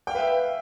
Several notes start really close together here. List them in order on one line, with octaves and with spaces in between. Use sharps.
G5 F5 B4 E5